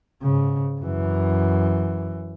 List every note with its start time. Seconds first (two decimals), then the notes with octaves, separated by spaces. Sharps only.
0.22 G#2 C#3
0.81 F#2 E3